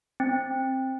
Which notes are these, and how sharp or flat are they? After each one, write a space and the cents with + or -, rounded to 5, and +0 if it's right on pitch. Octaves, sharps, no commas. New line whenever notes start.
C4 +10